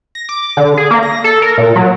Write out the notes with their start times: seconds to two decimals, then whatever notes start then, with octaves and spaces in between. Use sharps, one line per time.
0.15 A#6
0.29 D6
0.57 D3
0.77 G#4
0.91 A#3
1.03 A#6
1.24 A4
1.42 A#4
1.58 A#2
1.76 F#3